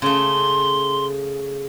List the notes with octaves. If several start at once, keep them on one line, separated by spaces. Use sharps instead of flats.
C#3 A3 C6